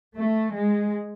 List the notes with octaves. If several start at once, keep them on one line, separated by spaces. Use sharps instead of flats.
A3
G#3